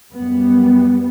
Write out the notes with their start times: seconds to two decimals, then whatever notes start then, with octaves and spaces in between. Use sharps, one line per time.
0.13 F#2 G3 B3